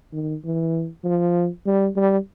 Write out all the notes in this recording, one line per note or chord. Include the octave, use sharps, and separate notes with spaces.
D#3
E3
F3
G3
G3